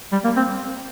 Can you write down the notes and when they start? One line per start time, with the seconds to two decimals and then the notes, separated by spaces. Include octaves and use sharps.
0.12 G3
0.24 A#3
0.36 C4